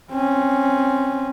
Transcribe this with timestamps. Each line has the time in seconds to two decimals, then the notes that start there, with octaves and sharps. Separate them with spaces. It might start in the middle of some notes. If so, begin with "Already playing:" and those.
0.11 C4 C#4